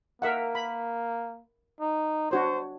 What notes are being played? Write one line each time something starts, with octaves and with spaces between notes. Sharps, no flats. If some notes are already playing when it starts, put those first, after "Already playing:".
A#3 A#4 E5 F#5
B5
D#4
D4 F#4 C5 C#5